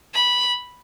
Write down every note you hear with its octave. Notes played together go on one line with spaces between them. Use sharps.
B5